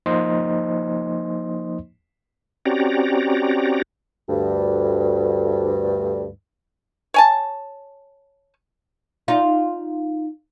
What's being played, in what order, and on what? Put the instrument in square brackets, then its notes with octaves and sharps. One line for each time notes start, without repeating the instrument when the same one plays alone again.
[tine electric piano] F3 A#3 D#4 C5 D#5 C6
[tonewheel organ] C4 C#4 F#4 G4 D5 A#5
[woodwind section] D2 G2
[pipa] C#5 G#5 A5
[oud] D#4 F4